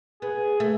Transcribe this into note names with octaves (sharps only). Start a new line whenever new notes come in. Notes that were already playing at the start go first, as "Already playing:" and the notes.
B3 G#4
A3